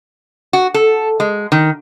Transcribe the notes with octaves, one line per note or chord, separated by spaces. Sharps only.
F#4
A4
G#3
D#3